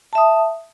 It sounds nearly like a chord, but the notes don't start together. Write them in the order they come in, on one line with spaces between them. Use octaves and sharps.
A5 E5 D#6